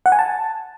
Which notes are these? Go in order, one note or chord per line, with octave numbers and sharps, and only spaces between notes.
F#5
G#5
A5